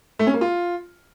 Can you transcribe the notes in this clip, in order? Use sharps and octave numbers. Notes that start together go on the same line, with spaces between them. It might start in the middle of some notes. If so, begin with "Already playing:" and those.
A3
C#4
A#3
F4